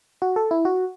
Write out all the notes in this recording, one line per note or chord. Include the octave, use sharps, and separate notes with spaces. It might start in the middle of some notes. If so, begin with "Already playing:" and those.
F#4
A4
E4
F#4